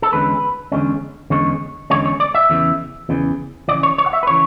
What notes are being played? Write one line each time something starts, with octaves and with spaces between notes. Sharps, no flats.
A4
E2 D3 G#3 C#4 B4
E2 D3 G#3 C#4
E2 D3 G#3 C#4 C#5
E2 D3 G#3 C#4 C#5
C#5
D5
E5
E2 C#3 E3
E2 C#3 E3
E2 D5
C#3 E3
C#5
C#5
F#5
E5
B4
C#3 E3 C#5